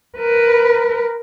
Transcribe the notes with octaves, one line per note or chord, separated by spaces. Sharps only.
A#4 B4